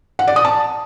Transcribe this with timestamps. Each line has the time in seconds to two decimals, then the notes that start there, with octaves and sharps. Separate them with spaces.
0.19 F#5
0.28 D5
0.36 D#6
0.45 A5